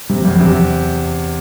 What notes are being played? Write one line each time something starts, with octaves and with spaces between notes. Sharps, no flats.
C3 G3
E2 F#3
C3 F3
F#3